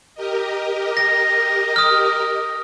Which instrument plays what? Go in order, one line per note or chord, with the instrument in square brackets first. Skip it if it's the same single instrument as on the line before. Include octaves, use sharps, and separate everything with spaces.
[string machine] G4 A#4 D#5
[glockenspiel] A#6
D#6 F6